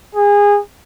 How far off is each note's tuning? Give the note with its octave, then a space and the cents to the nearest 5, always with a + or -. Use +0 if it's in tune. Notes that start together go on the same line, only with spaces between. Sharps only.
G#4 -25